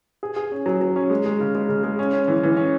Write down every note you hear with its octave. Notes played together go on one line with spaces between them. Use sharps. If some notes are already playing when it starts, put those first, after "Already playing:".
G#4
G#4
C#4
F#3
F#3
C#4
G#3
G#3
C#3
G#3
C#3
G#3
C#4
C#4
E3
E3
C#4